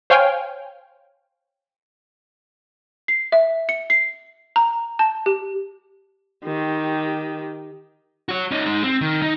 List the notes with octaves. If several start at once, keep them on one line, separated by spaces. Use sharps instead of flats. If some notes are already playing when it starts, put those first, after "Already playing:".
C5 C#5 F5 G5 G#5 F6
C7
E5
C#7
C7
A#5
A5
G4
D#3 G4
F#4 C#5
C#4 D#4
G#3 D#4
C4
D#3
D#4